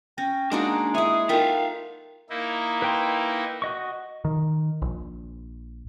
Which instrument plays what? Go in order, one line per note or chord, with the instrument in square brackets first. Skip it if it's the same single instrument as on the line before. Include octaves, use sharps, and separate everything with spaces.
[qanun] C#4 [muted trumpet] G5 [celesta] A#6
[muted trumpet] G#3 [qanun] A#3 D#4 F#4 [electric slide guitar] D4
[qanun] E4 C#5 [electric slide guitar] G#4 [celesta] E5 D#6
[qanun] D#4 F4 A4 [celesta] A#4 G5 [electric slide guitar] E5 F5
[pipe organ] A#3 D#4 E4
[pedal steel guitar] B4 G5 C6
F#4 D#5 C#6
[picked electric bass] D#3
A#1